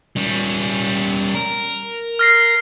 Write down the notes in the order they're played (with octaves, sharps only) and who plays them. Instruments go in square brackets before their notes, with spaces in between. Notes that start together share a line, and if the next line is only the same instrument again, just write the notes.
[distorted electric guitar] G3 C#4
A#4
[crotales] F6 A#6 C7